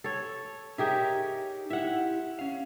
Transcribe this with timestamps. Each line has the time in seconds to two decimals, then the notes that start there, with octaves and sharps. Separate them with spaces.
0.04 A4 C#5
0.78 D#4 G4 G#4 A#4 C#5 E5
1.70 E4 G4 E5 F#5
2.39 C#4 F5